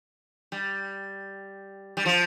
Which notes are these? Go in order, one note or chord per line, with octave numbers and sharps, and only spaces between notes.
G3
G3
F3